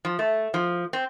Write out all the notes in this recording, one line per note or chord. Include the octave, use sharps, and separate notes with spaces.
F3
A3
F3
C4